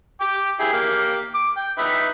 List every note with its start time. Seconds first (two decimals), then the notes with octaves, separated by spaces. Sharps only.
0.21 G5 D6
0.60 E4 G4 G#4
0.73 A#3 G4
1.35 D6
1.57 G5
1.78 D#4 B4 E5